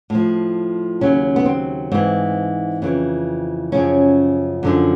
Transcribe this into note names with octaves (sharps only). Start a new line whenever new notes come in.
A2 F3
D#2 C#3 F#3 C#4
B3
C4
G#2 E3 C4
F2 C#3 E3
F#2 C#3 F3 C#4
F#2 D3 F3